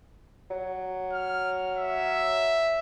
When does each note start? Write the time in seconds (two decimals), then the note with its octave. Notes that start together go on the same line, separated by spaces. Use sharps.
0.51 F#3
1.13 F6
1.77 E5